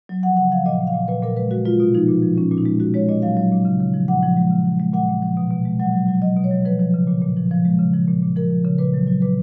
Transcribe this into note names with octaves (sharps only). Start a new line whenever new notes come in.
F#3
F3 F#5
C#3 F#5
F3 F5
A#2 D#5
A#2
F5
A#2
A#2 B4
A#2 A#4
G#3 B4
G#3 F#4
G#3 F4
B2 F4
F3 D#4
A#2
F3
A#2 C#4
A#2
D#4
G#3
G#3 F#4
G#3 C#5
A#2 D#5
F#3 F5
F#3
A#2
C#3
C#3
F3
A#2 F#5
F3
G#3
C#3
F3
G#3
A#2 F#5
A#2
F3
B2
B2
G#3
F#3 F#5
F#3
F#3
F#3 D#5
B2
C#5
F#3
F3 B4
F3
C#3
A#2
A#2
F3
F3
G#3
C#3
F3
A#2
A#2
F3 A#4
F3
C#3
A#2 B4
F#3
F#3
A#2 B4